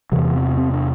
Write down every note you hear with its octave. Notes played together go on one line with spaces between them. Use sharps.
E2 C3 E3
C4
C4
D4